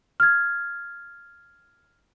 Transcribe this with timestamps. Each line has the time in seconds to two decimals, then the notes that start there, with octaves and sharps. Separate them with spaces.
0.20 F6 G#6